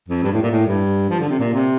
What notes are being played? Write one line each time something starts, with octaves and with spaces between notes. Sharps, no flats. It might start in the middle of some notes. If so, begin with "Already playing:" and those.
F2
G2
A2
A#2
A2
G2
F3
D3
C3
A#2
C3